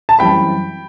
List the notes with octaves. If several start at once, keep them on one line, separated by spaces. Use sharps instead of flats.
A5
F#2 E3 G3 C4 G5 B5